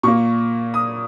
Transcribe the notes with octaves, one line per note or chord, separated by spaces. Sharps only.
A#2 A#3 C#6
D#6